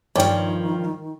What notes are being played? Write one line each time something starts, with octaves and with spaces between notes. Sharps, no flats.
G2 D#3 F3 C#5 D5 G5